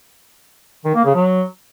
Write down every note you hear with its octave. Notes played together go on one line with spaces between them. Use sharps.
D#3
A#3
C#3
F#3